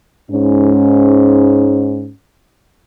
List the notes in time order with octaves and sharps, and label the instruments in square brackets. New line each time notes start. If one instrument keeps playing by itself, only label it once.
[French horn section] G#2 C#4